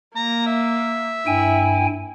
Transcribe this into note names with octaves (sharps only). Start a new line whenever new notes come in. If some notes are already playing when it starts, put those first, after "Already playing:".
A#3 A#5
E5
G2 E4 G5 G#5